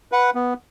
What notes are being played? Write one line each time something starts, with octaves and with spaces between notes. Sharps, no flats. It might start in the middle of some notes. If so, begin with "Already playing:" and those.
B4 F#5
B3